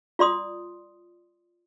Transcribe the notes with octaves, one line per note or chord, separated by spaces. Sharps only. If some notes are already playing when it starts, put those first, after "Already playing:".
F4 D5 C6 D#6